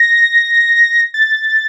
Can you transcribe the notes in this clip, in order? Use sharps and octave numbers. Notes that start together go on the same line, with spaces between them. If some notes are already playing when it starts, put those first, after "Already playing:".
Already playing: A#6
A6